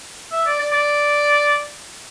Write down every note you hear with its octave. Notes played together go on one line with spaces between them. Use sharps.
E5
D5
D5
D5